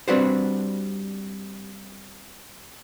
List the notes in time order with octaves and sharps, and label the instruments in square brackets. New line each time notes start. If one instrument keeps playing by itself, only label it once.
[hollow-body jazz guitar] G3 C4 D4 F#4 B4 C5